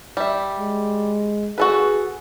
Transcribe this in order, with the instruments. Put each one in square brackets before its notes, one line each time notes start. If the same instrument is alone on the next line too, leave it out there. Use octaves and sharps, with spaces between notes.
[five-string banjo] G3 E5
[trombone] G#3
[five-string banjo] F#4 A4 B4 [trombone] G#4